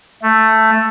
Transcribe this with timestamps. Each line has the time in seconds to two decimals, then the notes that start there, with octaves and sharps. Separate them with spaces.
0.22 A3